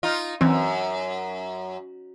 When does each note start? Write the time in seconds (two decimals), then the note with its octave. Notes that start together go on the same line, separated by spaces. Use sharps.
0.03 D#4 F4
0.41 F#2 E3 C4